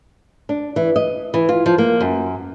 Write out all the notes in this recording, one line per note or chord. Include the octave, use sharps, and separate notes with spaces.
D4
E3
D#5
E3
F4
F3
A#3
F#2